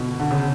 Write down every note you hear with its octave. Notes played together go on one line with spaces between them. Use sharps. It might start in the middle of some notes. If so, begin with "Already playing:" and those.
Already playing: B2 D3
D3
C#3